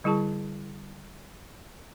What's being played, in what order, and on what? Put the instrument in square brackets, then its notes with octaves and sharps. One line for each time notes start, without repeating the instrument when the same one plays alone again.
[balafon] D3 G3 E4 G#4 A5 C#6